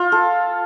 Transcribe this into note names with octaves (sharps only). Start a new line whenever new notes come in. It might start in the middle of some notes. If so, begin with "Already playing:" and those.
Already playing: F4
A4